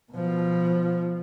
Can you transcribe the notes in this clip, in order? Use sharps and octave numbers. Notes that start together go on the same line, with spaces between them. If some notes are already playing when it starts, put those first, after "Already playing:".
B2 F3